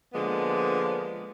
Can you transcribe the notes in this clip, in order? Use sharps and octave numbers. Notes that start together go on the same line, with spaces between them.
D3 F3 G#3 A#3 B3